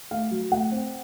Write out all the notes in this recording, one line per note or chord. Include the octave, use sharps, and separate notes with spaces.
A3 F5
F#3
A3 F#5
C4